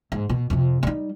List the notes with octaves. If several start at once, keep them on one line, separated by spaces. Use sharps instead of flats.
G#2
B2
F2 C3
G3 D#4